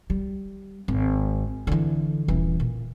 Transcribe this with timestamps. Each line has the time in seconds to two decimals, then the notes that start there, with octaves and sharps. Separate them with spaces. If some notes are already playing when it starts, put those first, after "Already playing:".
0.10 G3
0.88 G#1
1.67 D3 E3
2.28 D#1 E3
2.60 A#2